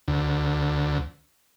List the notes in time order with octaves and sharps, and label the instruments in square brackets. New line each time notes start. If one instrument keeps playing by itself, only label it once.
[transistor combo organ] D2